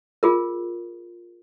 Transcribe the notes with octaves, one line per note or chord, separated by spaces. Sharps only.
F4 G#4 A#4